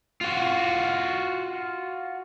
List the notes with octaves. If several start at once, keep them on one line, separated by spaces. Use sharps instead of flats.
F4 F#4